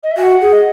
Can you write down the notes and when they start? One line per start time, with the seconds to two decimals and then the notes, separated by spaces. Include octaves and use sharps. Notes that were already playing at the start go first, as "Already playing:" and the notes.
0.03 D#5
0.11 E5
0.17 F#4 G#5
0.22 F#5
0.41 G#4
0.52 D#5